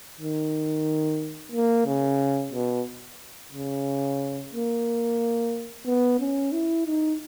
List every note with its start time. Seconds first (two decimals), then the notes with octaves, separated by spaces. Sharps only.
0.19 D#3
1.52 A#3
1.86 C#3
2.52 B2
3.52 C#3
4.53 A#3
5.86 B3
6.20 C#4
6.52 E4
6.86 D#4